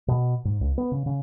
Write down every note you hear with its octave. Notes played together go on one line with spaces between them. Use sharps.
B2
G#2
C#2
B3
C#3
C#3